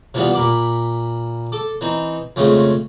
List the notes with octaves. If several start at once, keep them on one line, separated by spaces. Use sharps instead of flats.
C3 E3 F3 G3 B3
A#2 A#4 B5 D6
A4 D6
E3 C4 D#4
F2 C#3 G#3 A3 C4 C#4